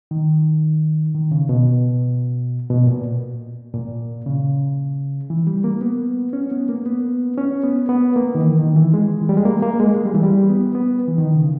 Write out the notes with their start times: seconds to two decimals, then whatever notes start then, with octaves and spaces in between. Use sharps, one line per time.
0.11 D#3
1.15 D#3
1.31 C#3
1.49 B2
2.70 B2
2.87 A#2
3.74 A#2
4.26 C#3
5.30 E3
5.47 G3
5.64 A#3
5.81 B3
6.33 C#4
6.51 B3
6.69 A#3
6.86 B3
7.37 C#4
7.64 B3
7.89 B3
8.16 A#3
8.35 D#3
8.41 E3
8.59 D#3
8.76 E3
8.94 G#3
9.22 E3
9.29 G3
9.37 G#3
9.45 A#3
9.62 A#3
9.80 G#3
9.97 G#3
10.05 G3
10.14 E3
10.23 G3
10.49 B3
10.75 B3
11.08 E3
11.18 D#3
11.36 C#3